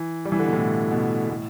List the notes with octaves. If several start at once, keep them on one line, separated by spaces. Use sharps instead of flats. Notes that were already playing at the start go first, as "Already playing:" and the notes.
Already playing: E3
G3
E3
D3
B2
A2
B2
A2